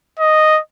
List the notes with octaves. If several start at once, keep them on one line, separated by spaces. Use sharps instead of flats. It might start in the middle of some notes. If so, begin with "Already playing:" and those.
D#5